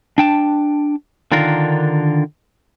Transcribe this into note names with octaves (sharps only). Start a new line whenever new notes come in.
D4 G5 A5
D3 D#3 D4 F4 A#4